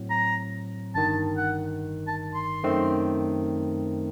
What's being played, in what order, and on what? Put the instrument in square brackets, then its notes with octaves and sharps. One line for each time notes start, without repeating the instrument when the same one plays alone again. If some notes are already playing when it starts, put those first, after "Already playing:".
Already playing: [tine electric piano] A2 F#3 C4
[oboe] A#5
[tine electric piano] G1 G2 D#3 [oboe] A5
[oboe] F#5
A5
C6
[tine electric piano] F#2 D#3 A3 C4